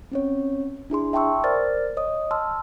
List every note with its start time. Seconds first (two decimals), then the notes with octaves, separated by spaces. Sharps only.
0.11 C4 C#4 C#5
0.90 D4 E4 G#4 C6
1.13 E5 G5 A5 C6 C#6 E6
1.44 A#4 C5 D5 F6 A6
1.97 C#5 D#5 D#6
2.31 A5 C6 E6 F6